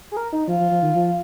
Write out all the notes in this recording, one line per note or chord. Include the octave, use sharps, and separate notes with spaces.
G#4
A#4
D#4
F3 F4
F3
F3
D#3
F3